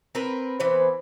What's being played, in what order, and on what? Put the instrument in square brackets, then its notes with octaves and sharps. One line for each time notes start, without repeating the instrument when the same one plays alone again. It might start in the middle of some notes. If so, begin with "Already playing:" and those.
[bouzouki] C4 A#4 B4
[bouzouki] E3 B3 [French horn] C5